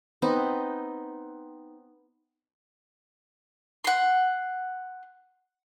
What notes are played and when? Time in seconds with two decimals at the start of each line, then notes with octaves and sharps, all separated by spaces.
0.22 B3 C4 D#4 B4
3.84 F#5 C6